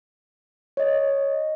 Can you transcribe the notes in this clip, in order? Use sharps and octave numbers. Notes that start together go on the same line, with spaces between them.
C#5 D#5